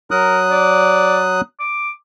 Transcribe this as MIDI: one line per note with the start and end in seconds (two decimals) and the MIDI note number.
0.11 1.41 54
0.11 0.40 70
0.11 1.41 87
0.11 1.41 90
0.51 1.20 74
1.60 1.90 86